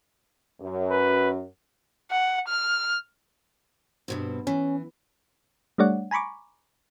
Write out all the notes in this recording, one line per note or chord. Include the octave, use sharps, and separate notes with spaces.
F#2
B4
F#5
F6
G2 B2 C4
E3 C#4
G3 A3 D4 C#5 D5 F#5
G#5 A#5 B5 C#6 D6